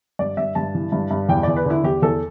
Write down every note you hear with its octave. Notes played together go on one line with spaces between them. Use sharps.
G2 D5
G2 E5
G2 A5
E3
G2
G2
E2 G5
E2 D5
B4
D3 E4
E2 G4
E2 A4